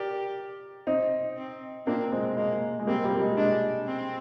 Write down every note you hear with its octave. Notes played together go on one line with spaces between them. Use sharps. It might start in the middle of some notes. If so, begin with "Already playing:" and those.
Already playing: G4 A#4 D5
C4 D#4
C4
A#3 C4 D4
G#3 C4
G#3 A#3
G#3
G3 A#3 C4
G3 A#3
G3
G#3
G#3 D4
C4